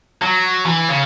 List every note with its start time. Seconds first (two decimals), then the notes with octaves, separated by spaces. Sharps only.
0.22 F#3
0.67 E3
0.89 C#3